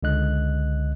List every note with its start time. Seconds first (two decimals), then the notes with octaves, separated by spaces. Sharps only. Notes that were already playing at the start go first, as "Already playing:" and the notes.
0.03 C#2 D3 D#5 F#6